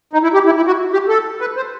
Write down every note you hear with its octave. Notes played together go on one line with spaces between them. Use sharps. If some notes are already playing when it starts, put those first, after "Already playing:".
D#4
E4
G4
E4
E4
F#4
G4
A4
B4
C5